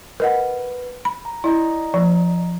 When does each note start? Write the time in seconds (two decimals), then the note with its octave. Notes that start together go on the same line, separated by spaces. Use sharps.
0.20 A#4 B4 D#5 F#5
1.05 B5
1.25 A#5
1.44 E4 D5 D#5 A#5
1.94 F3